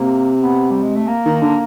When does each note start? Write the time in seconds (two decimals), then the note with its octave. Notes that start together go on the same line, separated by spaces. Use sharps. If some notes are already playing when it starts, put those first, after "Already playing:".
Already playing: C3 A#3
0.42 B3
0.71 G3
0.83 G#3
0.96 A3
1.08 A#3
1.25 D#3
1.42 D3